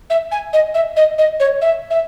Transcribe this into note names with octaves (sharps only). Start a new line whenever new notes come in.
E5
G#5
D#5
E5
D#5
D#5
C#5
E5
E5